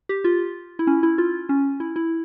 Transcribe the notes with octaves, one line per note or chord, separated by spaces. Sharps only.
G4
F4
E4
C#4
E4
F4
C#4
E4
E4